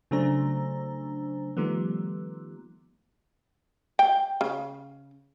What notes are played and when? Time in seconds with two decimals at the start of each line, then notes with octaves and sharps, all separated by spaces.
0.11 C#3 F#3 A3 D4 C5 A#5
1.57 D#3 F3 G3 A3 B3
3.99 G5
4.41 C#3